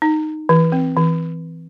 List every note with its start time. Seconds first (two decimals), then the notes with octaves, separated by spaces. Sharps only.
0.02 D#4
0.49 E3
0.72 C4
0.97 E3